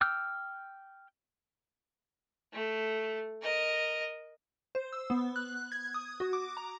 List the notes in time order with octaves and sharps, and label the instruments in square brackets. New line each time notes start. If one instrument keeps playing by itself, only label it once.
[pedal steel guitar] G5 D6 E6 F6 G6
[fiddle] A3
A#4 D#5
[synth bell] C5
E6
B3
F#6
G#6
D#6
F#4
D6
A#5